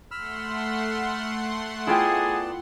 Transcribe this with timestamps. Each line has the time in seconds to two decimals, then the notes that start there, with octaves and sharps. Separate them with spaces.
0.11 A3 F#5 B5 C6 E6 F6
1.87 B3 E4 F4 G#4 D5 G5 A5